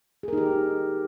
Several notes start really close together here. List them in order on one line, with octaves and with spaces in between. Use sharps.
G#4 A#4 D#4 G4